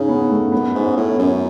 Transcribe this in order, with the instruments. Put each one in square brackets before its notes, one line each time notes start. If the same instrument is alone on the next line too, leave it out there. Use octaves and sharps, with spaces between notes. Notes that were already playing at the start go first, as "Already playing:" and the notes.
Already playing: [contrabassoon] C#3 [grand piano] C#4 D#4
[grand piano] B3
A3
[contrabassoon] F#2 [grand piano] B3
[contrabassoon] G#2
[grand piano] C#4
[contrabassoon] A2
[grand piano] B3
[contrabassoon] F#2 [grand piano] C#4